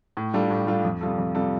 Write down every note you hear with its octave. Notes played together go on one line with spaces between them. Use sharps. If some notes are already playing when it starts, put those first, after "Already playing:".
A2
G3 D4 F4 A4
A2
G3 D4 F4 A4
F2
C3 G3 F4 A4
F2
C3 G3 F4 A4